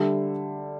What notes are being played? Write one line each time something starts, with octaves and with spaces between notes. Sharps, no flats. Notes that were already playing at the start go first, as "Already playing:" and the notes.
Already playing: D3 G3 E5